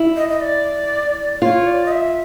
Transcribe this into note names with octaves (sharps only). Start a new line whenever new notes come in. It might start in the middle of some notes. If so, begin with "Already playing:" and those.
Already playing: E4
D#5
D#5
D5
F4 C#5
D5
D#5
E5